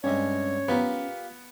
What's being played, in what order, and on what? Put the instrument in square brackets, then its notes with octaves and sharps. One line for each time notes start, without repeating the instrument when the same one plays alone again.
[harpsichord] G2 C3 G#3 [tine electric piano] C#4 [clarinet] C#5
[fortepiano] B3 [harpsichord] F4 G4 A#4